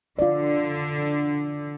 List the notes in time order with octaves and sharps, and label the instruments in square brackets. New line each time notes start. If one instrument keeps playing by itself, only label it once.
[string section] D3 [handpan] F4 D5